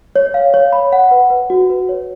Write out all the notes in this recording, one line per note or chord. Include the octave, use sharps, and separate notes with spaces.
C#5
F5
C#5
B5
F#5
B4
B4
F#4
B4
C#5